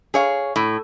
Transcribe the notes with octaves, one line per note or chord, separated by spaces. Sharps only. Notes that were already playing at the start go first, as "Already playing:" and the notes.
G#4 C#5 F5
A2